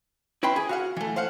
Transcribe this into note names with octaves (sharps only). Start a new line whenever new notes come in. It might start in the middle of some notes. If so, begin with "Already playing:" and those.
E4 B4 G5 B5 C6
G#4
F#4 F5 F#5
E3 A3
C5 F5 F#5